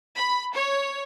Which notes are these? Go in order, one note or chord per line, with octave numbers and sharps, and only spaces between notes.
B5
C#5